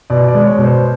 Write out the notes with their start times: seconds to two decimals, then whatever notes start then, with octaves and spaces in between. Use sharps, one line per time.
0.10 B2 D5
0.28 D5
0.35 G#3
0.47 C#5
0.58 B2
0.65 C5